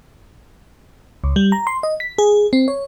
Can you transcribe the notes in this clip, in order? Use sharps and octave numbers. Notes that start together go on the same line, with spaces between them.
C#2
G3
A#5
C6
D#5
B6
G#4
C4
C#5